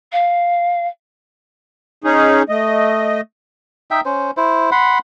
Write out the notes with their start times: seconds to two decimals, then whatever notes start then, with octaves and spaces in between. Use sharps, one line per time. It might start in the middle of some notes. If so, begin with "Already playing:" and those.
0.12 F5
2.04 C#4 D#4 G#4
2.49 A3 D#5
3.91 D#4 E5 G5
4.05 C#4 C5
4.37 E4 C5
4.72 F#5 B5 C6